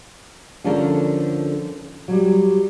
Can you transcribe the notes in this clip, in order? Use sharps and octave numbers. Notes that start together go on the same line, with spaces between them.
D3 F3 C#4 D4 A4 A#4
F#3 G3